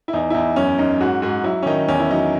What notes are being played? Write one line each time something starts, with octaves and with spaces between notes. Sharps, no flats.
E4
E2 D#4
E4
E2 D#4
F#2 C#4
F#2 D#4
G#2 F#4
G#2 F#4
F#3 E4
C#4
D#3 D#4
E2 C#4
E4
F#3 D#4